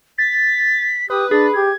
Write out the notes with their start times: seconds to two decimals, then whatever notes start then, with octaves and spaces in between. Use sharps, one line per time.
0.18 A6 B6
1.10 G4 B4 D#6
1.31 D4 G#4 A6
1.53 G4 G#6